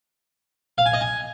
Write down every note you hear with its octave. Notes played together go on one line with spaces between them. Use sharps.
F5
G#5
D#5
G#5